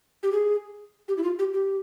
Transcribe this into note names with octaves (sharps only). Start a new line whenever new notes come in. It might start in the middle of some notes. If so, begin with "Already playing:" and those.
G4
G#4
G4
E4
F4
G4
G4